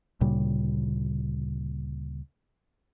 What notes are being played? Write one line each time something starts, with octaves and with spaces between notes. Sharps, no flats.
D2 A#2 C#3 G3